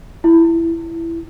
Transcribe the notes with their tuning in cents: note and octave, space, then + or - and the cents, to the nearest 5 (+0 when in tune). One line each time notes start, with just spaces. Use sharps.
E4 +10